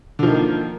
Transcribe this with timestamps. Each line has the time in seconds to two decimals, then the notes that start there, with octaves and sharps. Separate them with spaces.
0.19 D3
0.23 F3
0.27 D#3
0.31 A#3